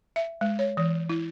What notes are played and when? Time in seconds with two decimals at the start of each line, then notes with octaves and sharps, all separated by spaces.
0.16 E5
0.41 G#3
0.59 C#5
0.77 E3
1.09 E4